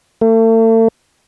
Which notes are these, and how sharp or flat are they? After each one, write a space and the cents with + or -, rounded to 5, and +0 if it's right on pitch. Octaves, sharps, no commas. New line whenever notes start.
A3 +40